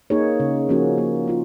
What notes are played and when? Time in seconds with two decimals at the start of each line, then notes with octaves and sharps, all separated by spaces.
0.10 A#3 D#4 G#4 C#5
0.40 C#3
0.69 F3 A#3 C#4 F#4
0.98 A#3
1.28 C#4 F4